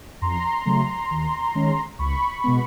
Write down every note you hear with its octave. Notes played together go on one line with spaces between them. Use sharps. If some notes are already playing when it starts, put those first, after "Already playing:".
F2 A#5 C6
C#3 F#3 A3
D#2
D#3 G#3 C#4
C#2 B5 C#6
B2 G#3 B3